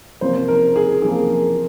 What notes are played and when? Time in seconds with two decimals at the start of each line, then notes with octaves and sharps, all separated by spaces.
0.21 C3 F3 A#3 C5
0.48 A#4
0.76 G#4
1.02 C3 F3 A#3 G#4